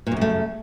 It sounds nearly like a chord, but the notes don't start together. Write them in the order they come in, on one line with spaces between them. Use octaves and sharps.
A#2 F#2 C#3 A3